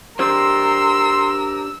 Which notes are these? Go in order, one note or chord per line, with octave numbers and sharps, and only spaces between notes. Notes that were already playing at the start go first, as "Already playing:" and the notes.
D4 G4 A#4 C5 C6 E6